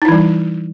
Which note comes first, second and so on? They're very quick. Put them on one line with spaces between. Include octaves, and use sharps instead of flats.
D#4 E4 E3 G3